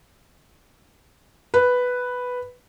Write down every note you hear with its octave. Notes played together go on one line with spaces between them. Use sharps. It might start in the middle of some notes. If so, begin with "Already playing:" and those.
B4